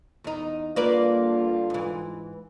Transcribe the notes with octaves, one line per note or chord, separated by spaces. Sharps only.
E2 D#4
G2 D3 A#3 F4 B4 D5
G#2 E3